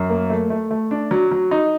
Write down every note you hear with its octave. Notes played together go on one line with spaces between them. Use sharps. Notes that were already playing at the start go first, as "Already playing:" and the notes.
Already playing: F#2
A#3
A3
A3
A3
D4
F#3
F#3
D#4